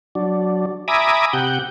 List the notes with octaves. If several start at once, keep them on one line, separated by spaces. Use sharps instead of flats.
F#3 D4
E5 G#5 A#5 B5 D6 D#6
C3 G4 F#5 G6